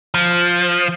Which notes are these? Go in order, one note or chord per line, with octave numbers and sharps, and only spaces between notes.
F3